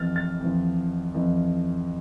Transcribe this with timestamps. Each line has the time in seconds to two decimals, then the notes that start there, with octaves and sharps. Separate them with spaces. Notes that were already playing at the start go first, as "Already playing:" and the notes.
Already playing: F2 E3 F6 A6
0.16 F6 A6
0.41 F2 E3
1.14 F2 E3